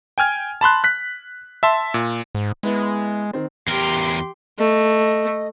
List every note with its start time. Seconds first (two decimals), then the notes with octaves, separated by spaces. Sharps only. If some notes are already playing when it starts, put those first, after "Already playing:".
0.18 G5 G#5 F6 G#6
0.61 A5 B5 C6 F#6
0.84 F#6 B6
1.63 E5 A5 C6
1.94 A#2
2.35 G#2
2.63 G#3 B3 E4 B4
3.33 D#3 C4
3.68 E2 G4 A#4 C6
4.59 A3 D#5